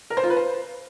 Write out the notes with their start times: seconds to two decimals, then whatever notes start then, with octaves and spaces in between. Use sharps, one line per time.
0.10 A#4
0.17 C5
0.23 F4
0.30 B4
0.37 C5